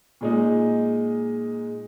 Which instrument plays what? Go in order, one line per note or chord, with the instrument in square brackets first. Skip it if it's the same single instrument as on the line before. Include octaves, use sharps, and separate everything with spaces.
[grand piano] A#2 G#3 D#4